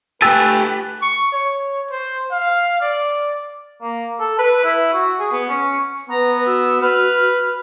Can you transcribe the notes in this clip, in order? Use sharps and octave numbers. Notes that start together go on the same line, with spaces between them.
A3 G4 B4 G#5 A5 E6
C#6
C#5
C5
F5
D5
A#3
A4
B4
E4
F#4
G#4
B3
C#4
B3 B4 A#5
F#4 E6
B4 F6